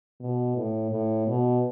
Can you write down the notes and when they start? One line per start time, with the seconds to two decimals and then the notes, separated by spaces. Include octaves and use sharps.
0.21 B2
0.56 A2
0.91 A2
1.27 B2